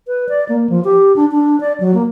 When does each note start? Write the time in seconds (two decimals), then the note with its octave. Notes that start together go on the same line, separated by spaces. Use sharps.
0.07 B4
0.29 D5
0.49 A#3
0.70 F3
0.84 G4
1.16 D4
1.32 D4
1.61 D5
1.80 F#3
1.94 A#3